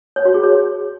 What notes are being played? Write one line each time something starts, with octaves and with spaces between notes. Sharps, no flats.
C#5
F#4
G#4
C#5